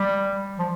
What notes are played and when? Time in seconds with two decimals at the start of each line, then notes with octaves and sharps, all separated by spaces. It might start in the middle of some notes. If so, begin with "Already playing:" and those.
Already playing: G3
0.59 F3